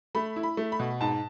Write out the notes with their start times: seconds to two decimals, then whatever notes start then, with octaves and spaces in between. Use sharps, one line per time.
0.15 A3 B5
0.36 E4
0.43 B5
0.57 A3
0.72 B5
0.79 B2
1.01 G#2 A5